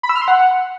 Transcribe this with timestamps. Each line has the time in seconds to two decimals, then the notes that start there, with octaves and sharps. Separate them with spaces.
0.03 B5
0.09 E6
0.16 F6
0.22 C6
0.28 F#5